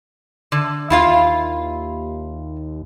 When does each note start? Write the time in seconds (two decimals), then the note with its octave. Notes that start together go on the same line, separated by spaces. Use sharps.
0.52 D3
0.90 D#2 E4 F4 F5